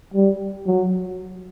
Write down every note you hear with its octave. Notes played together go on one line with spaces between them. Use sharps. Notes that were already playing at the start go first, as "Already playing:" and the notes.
G3
F#3